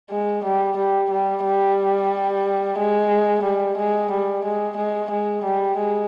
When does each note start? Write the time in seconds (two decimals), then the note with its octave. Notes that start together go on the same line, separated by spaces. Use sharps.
0.11 G#3
0.44 G3
0.77 G3
1.10 G3
1.44 G3
2.78 G#3
3.43 G3
3.77 G#3
4.11 G3
4.44 G#3
4.77 G#3
5.10 G#3
5.44 G3
5.77 G#3